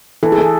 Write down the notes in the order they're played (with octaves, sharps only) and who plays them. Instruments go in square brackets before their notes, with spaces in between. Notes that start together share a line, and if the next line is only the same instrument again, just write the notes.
[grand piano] E3 [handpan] A4
[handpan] G#4
[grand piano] E3 [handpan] A4